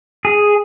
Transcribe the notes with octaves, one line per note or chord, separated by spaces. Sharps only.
G#4